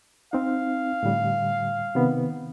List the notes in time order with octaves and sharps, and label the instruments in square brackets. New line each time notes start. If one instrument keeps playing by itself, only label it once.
[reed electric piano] C4 D#4 [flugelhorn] F5
[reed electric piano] A2 D3 G3
C3 D#3 B3